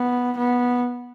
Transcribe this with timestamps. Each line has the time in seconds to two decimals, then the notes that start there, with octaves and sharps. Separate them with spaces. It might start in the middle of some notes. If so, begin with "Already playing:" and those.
Already playing: B3
0.37 B3